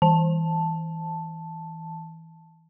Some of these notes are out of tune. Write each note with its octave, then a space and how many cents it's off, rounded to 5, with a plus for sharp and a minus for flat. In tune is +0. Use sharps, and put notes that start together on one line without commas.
E3 -15 A5 +0